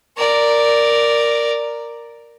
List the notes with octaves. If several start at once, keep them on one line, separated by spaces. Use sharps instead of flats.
A#4 D5